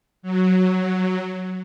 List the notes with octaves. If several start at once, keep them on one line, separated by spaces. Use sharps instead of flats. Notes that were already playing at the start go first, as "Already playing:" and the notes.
F#3